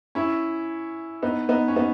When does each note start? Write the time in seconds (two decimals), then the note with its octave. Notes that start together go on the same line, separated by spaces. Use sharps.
0.15 C#4 E4
1.23 B3 D#4
1.49 B3 D#4
1.68 C#4
1.76 B3 D#4